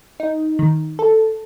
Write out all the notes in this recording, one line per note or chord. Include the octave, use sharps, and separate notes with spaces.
D#4
D#3
A4